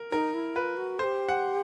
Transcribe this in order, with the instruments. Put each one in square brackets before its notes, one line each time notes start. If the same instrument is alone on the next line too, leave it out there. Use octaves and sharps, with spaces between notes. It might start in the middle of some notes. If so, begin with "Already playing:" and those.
Already playing: [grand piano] A#4
[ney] D#4 [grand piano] A#4
[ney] E4
[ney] F4 [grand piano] B4
[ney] F#4
[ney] A4 [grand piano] C5
[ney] G4
[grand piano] F#5